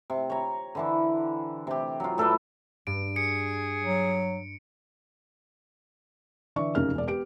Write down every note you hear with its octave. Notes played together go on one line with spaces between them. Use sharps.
C3
C#5 A#5
D3 E3 D4
C3 G4
F#3 F4
A2 A4 B4 D5
G2 D7
G#4 C#7
F#3
D3 E3 D5 E5 C#6
F1 F#2 C#3 D#4 A#4 F6
E1 D5
B3 G4 D7